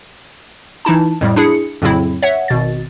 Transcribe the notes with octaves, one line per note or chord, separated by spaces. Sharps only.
E3 D#4 E4 A5
F2 A2 G3
D4 E4 G#4 C#7
F2 A2 C#3 F#3 C4 E4
C#5 E5 F#5
G#1 B2 A6